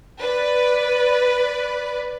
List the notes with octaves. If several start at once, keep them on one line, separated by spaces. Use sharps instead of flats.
B4 D5